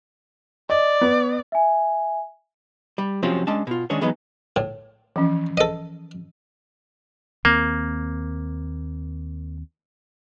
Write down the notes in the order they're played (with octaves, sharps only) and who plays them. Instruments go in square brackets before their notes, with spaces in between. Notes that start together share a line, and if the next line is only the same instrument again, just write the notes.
[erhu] D5 [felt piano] D#5
[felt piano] B3
[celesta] E5 G#5
[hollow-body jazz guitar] G3
C3 F3 F#3 C4 C#4 F4
G#3 C#4 D4 A5
B2 F4
D#3 G#3 C#4 D4 C#5
E3 F#3 G#3 B3 D#4
[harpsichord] A2
[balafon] E3 F3 C#4
[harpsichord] A4 D#5
[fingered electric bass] D#2 C4 [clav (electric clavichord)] A#3